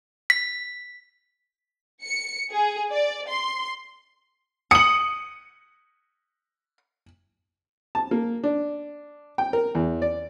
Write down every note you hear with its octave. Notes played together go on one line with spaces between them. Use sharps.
B6
C#7
G#4
D5
C6
D#6 C#7 F#7
A5
A#3
D4
G5
A#4
E2
D5